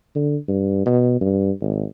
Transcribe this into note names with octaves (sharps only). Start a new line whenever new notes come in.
D3
G2
B2
G2
G#1